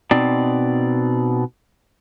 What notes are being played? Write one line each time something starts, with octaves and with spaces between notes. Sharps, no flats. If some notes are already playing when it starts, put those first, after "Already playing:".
B2 C4 D#4 D5